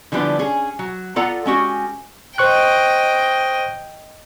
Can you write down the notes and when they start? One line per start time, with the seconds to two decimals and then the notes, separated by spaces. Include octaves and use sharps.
0.12 D3 E3 F3 G3 B3 D4
0.39 C#4 G#4
0.79 F#3
1.16 B3 F4 A4 D5 F#5 A#5
1.46 G#3 C#4 F#4 G4
2.38 C5 D#5 G5 C#6 F#6